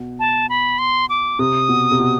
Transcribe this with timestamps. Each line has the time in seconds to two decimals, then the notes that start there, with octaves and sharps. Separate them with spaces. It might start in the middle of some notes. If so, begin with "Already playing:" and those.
Already playing: B2
0.20 A5
0.49 B5
0.79 C6
1.09 D6
1.39 C3 D#6
1.69 B2
1.92 C3
2.00 B2